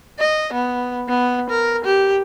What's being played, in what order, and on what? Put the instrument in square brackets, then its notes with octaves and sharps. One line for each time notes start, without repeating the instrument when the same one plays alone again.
[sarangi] D#5
B3
B3
A#4
G4